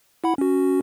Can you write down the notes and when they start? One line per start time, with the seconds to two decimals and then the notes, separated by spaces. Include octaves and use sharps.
0.24 E4 F#5 B5
0.38 C#4 F#4